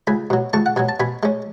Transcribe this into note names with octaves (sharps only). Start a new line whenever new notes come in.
C#2 G#5 B5
B2 F#3
C#2 A5 C#6
F#5
B2 F#3 G#5
A5
B2 G#5 B5
G#3 C#4